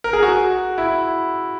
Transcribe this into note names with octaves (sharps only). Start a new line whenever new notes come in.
A#4
G#4
F#4
E4